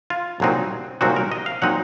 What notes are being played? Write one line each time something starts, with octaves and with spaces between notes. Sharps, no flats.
F4
C2 A#2 F#3 C4 D#4
C2 A#2 F#3 C4 D#4 F#4
A#4
D#5
F5
A#2 F#3 C4 D#4 F#5